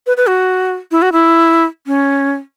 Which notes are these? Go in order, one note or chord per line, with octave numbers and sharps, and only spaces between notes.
B4
B4
F#4
E4
F#4
E4
C#4